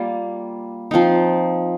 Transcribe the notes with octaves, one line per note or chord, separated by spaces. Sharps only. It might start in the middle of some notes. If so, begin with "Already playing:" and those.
Already playing: G3 A#3 F4
F3 C4 D#4